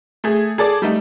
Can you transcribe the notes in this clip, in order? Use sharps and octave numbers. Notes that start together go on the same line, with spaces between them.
A3 G#4
G#4 A4 D5
G3 A3 D#4